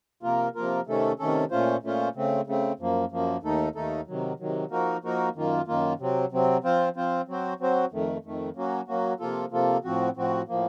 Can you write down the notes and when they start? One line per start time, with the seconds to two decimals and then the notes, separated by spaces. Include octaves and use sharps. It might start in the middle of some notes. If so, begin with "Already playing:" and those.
0.23 C3 F3 A#3 F4 A#4
0.55 C3 F3 A#3 F4 A#4
0.86 C3 D#3 A3 C#4 A4
1.19 C3 D#3 A3 C#4 A4
1.51 A#2 A3 C#4 F4 C5
1.83 A#2 A3 C#4 F4 C5
2.15 C#3 A3 C4
2.47 C#3 A3 C4
2.79 F#2 F3 A#3
3.11 F#2 F3 A#3
3.43 D#2 D#3 A3 D#4 A4
3.75 D#2 D#3 A3 D#4 A4
4.07 C3 D#3 F#3
4.40 C3 D#3 F#3
4.71 F3 A#3 D#4 F#4 A#4
5.04 F3 A#3 D#4 F#4 A#4
5.35 F#2 D#3 A#3 F4
5.67 F#2 D#3 A#3 F4
5.99 C3 F#3 C4
6.32 C3 F#3 C4
6.64 F3 C4 F4 C5
6.96 F3 C4 F4 C5
7.28 F#3 C4 F#4 C5
7.60 F#3 C4 F#4 C5
7.91 F2 D#3 A3
8.24 F2 D#3 A3
8.56 F#3 A#3 C#4 F#4
8.88 F#3 A#3 C#4 F#4
9.20 C3 F3 A#3 F4 A4
9.51 C3 F3 A#3 F4 A4
9.84 A2 F3 C4 F#4
10.16 A2 F3 C4 F#4
10.48 A2 F3 A#3